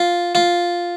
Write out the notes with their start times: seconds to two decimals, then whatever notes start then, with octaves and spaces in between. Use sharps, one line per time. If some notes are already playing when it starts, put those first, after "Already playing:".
Already playing: F4
0.35 F4